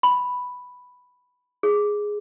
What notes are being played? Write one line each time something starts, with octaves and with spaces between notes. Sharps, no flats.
B5
G#4